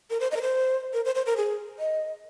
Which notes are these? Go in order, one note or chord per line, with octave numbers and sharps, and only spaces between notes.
A#4
C5
D#5
A#4
C5
A#4
C5
C5
A#4
G#4
D#5